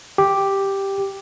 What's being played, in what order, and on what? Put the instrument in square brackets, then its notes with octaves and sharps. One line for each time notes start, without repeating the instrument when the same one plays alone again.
[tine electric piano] G4